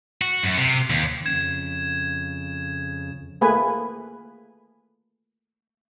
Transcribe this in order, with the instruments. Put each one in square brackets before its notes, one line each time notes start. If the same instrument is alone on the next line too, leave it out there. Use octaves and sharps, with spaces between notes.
[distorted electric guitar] F#4
F#2
C3
D#2
[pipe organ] F2 C#3 [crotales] G#6 E7
[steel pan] A3 A#3 G#4 B4 G#5